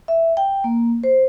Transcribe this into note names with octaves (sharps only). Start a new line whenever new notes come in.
E5
G5
A#3
C5